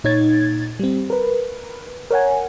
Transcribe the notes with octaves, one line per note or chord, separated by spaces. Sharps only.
A#2 D#4 C#5 G#6 A6
G3 C4
A#4 B4
A#4 C#5 F#5 G#5